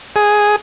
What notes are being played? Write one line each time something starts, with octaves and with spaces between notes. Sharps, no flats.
G#4